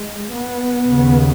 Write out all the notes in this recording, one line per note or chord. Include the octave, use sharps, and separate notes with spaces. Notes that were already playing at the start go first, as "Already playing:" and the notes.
Already playing: G#3
B3
D#2 C#3